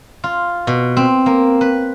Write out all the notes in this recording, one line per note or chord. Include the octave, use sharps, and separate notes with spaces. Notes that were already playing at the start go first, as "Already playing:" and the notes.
F4
B2
C4
A#3
B4